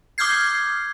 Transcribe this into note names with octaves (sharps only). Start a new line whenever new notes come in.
D6 D#6 F6 G6 G#6 C7